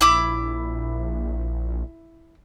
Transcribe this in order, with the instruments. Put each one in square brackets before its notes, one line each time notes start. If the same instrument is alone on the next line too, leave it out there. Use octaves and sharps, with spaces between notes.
[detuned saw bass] A#1 [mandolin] E4 B5 D6